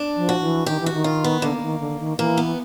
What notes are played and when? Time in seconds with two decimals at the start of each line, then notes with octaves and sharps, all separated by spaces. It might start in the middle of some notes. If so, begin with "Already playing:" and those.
Already playing: D4
0.16 F3
0.29 F#4
0.41 E3
0.66 D#3 G4
0.81 E3
0.86 F#4
0.93 D#3
1.04 F4
1.24 B3
1.42 D3 A#3
1.57 D3
1.62 D#3
1.80 D3
2.00 D#3
2.18 E3 A#3
2.37 B3